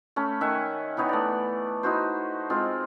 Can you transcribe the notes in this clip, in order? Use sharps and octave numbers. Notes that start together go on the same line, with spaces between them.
A3 C#4 B5
D#3 E5 F#5 G#5
E3 B3 D#4 C#5
A3 D5
D#4 E4 F#4 C5
G#3 C4 F4